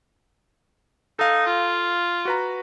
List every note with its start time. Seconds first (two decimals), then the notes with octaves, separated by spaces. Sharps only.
1.19 D#4 A4 F5
1.46 F4
2.25 F#4 B4 A#5